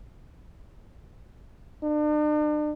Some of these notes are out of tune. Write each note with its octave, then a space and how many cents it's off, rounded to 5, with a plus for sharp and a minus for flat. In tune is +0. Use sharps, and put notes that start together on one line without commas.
D4 +40